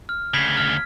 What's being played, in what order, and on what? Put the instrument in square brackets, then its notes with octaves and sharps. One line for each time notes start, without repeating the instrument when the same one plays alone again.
[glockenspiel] F6
[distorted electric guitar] D2 C#3 [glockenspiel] G#6 B6
[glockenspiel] F6